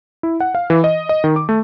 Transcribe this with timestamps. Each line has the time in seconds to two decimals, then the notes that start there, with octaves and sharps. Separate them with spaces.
0.23 E4
0.40 F#5
0.55 F5
0.70 E3
0.84 D#5
1.09 D#5
1.24 D#3
1.36 D6
1.49 A3